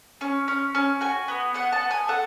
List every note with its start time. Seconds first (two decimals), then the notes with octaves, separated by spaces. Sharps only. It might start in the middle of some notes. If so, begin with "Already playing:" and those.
0.21 C#4
0.48 C#4
0.75 C#4
1.01 F#4 G#5
1.28 B3
1.54 B3 F#5
1.72 A5
1.81 B3
1.91 G#5
2.08 A4 F#5